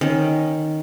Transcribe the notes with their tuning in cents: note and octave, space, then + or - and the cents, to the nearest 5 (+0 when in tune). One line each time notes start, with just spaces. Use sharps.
D#3 +0 C#4 -15